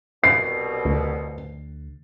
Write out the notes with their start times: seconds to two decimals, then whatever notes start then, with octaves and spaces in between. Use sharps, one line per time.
0.24 C2 B2 C7
0.85 D2